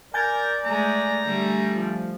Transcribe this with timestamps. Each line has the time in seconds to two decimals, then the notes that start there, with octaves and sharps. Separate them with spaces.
0.14 A#4 D5 G#5 G6 A6
0.65 G#3 A3 A#5
1.23 D3 G3 A3
1.75 F3